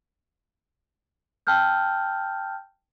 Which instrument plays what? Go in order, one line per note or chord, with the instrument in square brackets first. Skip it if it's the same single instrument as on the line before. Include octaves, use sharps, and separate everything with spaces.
[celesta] G5 A5 E6 F6 G6